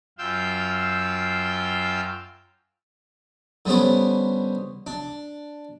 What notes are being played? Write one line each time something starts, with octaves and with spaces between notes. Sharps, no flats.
F#2 F4 F5 G5 E6 G6
D3 G3 B3 C#4 C5
D4